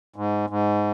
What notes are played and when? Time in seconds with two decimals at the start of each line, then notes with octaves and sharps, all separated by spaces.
0.16 G#2
0.50 G#2